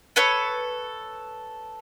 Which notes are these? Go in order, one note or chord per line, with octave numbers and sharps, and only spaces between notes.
A4 B4 C#5